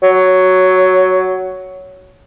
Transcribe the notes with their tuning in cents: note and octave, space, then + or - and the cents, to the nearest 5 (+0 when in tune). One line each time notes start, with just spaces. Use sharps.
F#3 +5